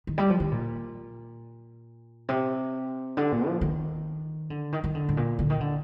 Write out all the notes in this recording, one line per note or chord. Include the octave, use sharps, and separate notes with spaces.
D#3
G3
F3
D#3
A#2
C3
D3
A#2
F3
D#3
D3
D#3
D#3
D3
A2
A#2
D3
D#3
D3